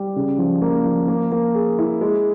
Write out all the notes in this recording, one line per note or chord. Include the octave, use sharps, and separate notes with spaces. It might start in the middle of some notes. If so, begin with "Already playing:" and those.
Already playing: G3
C#3
F3
A#3
F3
A#3
A#3
G#4
E4
G#3